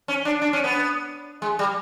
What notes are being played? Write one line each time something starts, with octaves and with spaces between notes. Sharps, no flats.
C#4
D4
D4
C#4
B3
G#3
G3